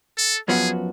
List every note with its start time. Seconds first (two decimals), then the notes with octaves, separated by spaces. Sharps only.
0.18 A4
0.48 F#2 F3 B3 F#4 G#4